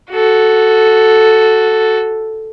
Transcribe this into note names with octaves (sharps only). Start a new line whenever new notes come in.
F#4 A4